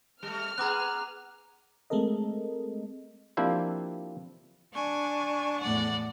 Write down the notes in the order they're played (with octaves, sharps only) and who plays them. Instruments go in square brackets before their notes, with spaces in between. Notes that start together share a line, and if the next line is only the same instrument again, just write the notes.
[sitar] G3 A3 [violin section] F6
[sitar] B3 G#4 [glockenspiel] A#5 D6 F#6
[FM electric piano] G#3 A3 C4 A4 A#4 D#5
[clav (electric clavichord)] F3 A#3 C4 D4 E4 G4
[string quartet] D4 G#5 C#6
E2 A2 D5 F#5